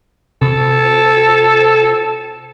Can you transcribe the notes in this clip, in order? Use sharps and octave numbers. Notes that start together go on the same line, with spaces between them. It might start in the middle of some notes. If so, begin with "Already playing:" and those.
C3 A4